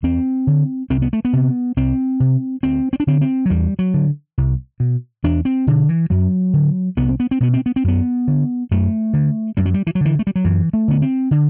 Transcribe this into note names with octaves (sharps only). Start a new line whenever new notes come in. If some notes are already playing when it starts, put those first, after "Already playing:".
E2 C4
D3
C2 C4
B3
A3
B3
C3
C2 C4
C3
D2 C4
C4
D4
D3 C4
C4
F#3
E2 G3
F#3
D3
C2
B2
E2 D4
C4
B2 D3
E3
F#2 F#3
D3
C2 B3
C4
B3
C4
B2 B3
C4
B3
C4
F#2 B3
D3
F#2 A3
D3
F#2 G3
F#3
G3
E3
F#3
D3 E3
A3
G3
F#3
F#2 E3
A3
D3 B3
C4
D3